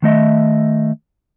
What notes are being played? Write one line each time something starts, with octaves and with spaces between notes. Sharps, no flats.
D#3 A3 D#5 E5